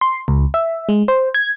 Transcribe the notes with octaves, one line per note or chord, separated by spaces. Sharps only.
C6
C#2
E5
G#3
C5
G#6